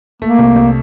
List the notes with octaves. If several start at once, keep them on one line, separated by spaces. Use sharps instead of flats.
A3 A#3
C2
C2